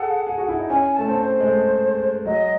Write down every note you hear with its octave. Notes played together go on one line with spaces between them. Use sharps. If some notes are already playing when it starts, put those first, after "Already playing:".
Already playing: G#4 A4 F#5
G#4
F#4
E4
D#4
C#4 G#5
A3 A5
C4
C5
G#3
A3
F#3 D#5